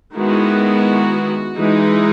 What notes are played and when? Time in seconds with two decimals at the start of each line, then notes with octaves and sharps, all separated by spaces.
0.15 D#3 G#3 B3 E4 F#4
1.57 E3 G#3 D#4